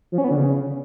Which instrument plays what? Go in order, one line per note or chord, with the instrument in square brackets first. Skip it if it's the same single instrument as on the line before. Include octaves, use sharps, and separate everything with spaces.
[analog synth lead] F3
C#4
B3
D3
C#3